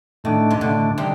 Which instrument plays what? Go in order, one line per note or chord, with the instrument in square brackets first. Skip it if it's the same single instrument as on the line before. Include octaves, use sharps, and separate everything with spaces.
[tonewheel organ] A2 A3 D4 [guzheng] D#3
[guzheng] C3
[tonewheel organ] A2 A3 D4 [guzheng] D3
[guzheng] C3 [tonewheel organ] D#3 G3 D4